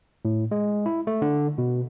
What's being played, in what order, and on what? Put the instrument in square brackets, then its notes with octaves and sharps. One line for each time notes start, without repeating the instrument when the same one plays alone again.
[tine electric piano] A2
G#3
E4
A3
D3
B2